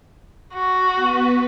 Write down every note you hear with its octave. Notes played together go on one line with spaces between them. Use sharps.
F#4
B3 B4